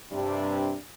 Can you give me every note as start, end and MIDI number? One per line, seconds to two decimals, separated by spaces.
0.12 0.76 43
0.12 0.76 48
0.12 0.76 55
0.12 0.76 62